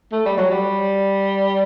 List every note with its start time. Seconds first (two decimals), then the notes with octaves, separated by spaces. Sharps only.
0.12 A3
0.26 G3
0.38 F#3
0.51 G3